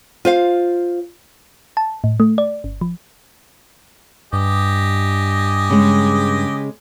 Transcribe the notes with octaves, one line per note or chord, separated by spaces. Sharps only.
F4 C5 F5
A5
A2
A3
D5
G1
F3
G2 G4 D#5 G#5
C#3 G#3